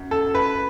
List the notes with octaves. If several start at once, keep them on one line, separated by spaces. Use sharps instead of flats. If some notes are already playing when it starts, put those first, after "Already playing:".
Already playing: F#2
A4
B4